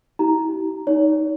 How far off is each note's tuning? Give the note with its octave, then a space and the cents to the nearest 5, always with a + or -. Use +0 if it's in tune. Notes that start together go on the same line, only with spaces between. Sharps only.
E4 -40 G4 -35 A#5 +0
D#4 +5 C#5 +45